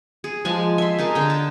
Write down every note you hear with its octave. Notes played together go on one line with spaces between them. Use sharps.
G#4
F3 G#3 G#5 A5
E5 C6
D#4 G#4 A#4 A5
D3 G5
A5